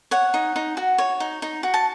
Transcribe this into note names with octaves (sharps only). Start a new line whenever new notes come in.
C#5 F#5
D#4
D#4
F#4
C#5
D#4
D#4
F#4
A5